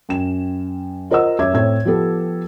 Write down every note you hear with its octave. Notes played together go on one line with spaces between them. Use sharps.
F#2 G5 E7
F4 A#4 C5 D#5 F#5 E6
F#2 C#5 E5 D6 G#6
A2 C4 C#5 G#6
F3 B3 G4 A4